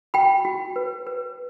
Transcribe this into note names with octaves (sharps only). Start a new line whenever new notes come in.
F#4 G5 B5
F#4
B4
B4